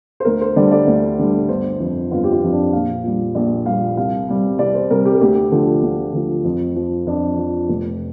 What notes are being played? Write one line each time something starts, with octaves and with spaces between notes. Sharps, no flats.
C5
D2 A#4
C5
D3 G3 D5
D5
D2
D3 G3
G1 C5
F2 F3
G1 F4
G4
F4
F2 F3
D4
A#1 F5
A#2 G3
A#1 D5
A#2 G3 F5
C2 F5
C3 G3
C2 D5
C5
C3 G3 A#4
G4
A#4
D2 G4
D3 F3
D2 F4
D3 F3
F2
F3
F2 D4
F3
F1